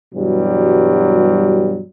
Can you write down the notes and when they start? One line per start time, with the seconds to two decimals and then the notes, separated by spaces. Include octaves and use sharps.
0.14 G2 B2 E3 F#3 G3